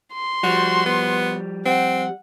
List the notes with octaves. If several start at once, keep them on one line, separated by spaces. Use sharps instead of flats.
C6
F3 G3 F#4
B3
C4 F#5